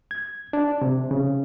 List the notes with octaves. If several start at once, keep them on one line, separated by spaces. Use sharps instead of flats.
G#6
D4
C3
C#3